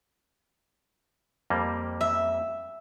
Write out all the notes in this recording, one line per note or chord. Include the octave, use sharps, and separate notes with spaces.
F2 G3 A#3
E5